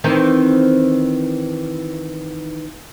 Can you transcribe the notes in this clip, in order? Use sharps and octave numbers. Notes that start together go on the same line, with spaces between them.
D#3 E3 C4